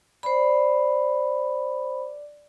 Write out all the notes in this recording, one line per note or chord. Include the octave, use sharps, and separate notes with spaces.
D4 C5 B5